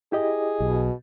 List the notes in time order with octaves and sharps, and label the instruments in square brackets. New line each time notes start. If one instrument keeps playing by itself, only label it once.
[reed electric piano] E4 G4 D#5 [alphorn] G#4
[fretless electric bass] B1 [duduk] B2